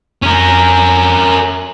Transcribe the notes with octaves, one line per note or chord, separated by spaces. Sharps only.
F2 C#4 A#4